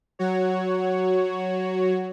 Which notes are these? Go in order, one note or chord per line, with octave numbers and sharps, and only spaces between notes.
F#3 F#4 C#5